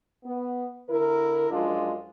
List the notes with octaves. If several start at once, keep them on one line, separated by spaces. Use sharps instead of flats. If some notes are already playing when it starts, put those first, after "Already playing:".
B3
D3 E4 A#4
F#2 F3 G#3 D4 F4